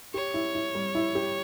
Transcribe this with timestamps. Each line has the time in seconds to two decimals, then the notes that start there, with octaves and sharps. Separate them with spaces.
0.14 G4 C#5
0.34 E4
0.55 E4
0.75 G3
0.95 E4
1.15 G4